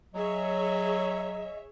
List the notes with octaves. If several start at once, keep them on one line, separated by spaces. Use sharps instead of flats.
F#3 G#4 C#5 D#5 E5